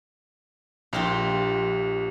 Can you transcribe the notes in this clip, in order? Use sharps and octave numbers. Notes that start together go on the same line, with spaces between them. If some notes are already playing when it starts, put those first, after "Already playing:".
A#1 F4 G4 A#4